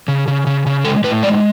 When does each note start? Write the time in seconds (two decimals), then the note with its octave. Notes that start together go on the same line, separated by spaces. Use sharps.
0.08 C#3
0.28 C#3
0.47 C#3
0.67 C#3
0.84 G#3 A4
1.04 A2 B4
1.23 G#3 D5